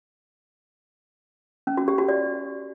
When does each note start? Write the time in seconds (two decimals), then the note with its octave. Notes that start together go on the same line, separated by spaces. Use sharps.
1.67 C#4
1.77 F#4
1.88 G4
1.98 F#4
2.09 D5